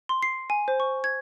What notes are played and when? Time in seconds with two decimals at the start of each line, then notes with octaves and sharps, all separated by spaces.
0.09 C6
0.23 C7
0.50 G#5
0.68 C5
0.80 C#6
1.04 G#6